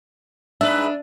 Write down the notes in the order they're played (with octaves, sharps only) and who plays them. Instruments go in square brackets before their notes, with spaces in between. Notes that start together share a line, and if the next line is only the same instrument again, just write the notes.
[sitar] G#2 B4 [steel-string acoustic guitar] D4 [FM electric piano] E5